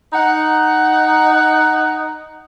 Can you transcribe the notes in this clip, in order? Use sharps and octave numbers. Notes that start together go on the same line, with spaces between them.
D#4 F#5